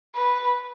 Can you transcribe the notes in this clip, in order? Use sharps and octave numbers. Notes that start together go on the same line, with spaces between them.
B4